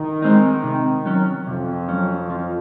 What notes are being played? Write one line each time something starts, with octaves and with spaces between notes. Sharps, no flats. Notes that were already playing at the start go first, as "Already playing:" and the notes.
Already playing: D#3
G#3 C4 D#4
C3
F#3 C#4
F2 C3
F#3 C#4
F3